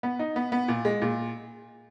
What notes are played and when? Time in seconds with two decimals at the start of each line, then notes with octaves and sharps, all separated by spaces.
0.03 B3
0.19 D#4
0.36 B3
0.52 B3
0.68 A#2
0.85 G#3
1.02 A#2